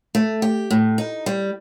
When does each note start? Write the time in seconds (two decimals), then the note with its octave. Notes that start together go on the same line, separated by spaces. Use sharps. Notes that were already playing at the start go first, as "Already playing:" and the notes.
0.15 A3
0.42 G4
0.71 A2
0.98 D#4
1.26 G3